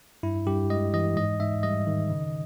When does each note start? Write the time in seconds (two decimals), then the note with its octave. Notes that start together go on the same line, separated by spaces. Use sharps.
0.23 G2 E4
0.47 G2 G4
0.70 G#3 D#5
0.94 E3 D#5
1.17 G#2 D#5
1.40 G#2 E5
1.63 G3 D#5
1.87 D#3
2.10 C#3